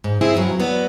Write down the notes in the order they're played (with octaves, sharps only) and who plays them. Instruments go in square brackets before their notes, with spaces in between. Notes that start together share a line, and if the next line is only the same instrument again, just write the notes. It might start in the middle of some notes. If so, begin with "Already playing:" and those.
[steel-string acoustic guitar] G#2
C4 E4 G#4
G2 C3 F3 F#3
F#3 B3 D5